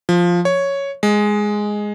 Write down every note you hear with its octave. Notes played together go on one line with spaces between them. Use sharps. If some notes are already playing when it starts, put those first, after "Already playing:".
F3
C#5
G#3